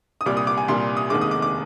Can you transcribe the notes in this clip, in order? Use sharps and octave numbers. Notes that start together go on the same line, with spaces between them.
D#6
C2 A#2 G3 D6
D#6
D6
G#5
C2 A#2 G3 C6
D#6
F1 D#2 D#3 G#3 D6
D#6
D6
D6